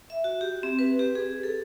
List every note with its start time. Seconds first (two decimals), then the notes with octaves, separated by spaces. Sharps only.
0.10 E5
0.24 F#4
0.41 G4
0.63 C4
0.79 B4
0.99 G4
1.15 G#4
1.43 A4